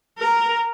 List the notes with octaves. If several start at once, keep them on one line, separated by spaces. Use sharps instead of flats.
A#4